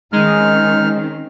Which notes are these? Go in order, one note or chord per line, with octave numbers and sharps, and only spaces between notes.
D#3 G#3 C4 C#4 D#4 F6